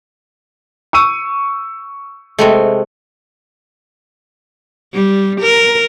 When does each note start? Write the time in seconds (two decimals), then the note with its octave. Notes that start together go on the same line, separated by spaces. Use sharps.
0.93 C#6 E6 D#7
2.39 C3 G#3 A3
4.94 G3
5.41 A#4